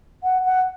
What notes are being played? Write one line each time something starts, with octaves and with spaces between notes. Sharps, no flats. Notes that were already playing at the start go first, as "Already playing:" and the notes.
F#5
F#5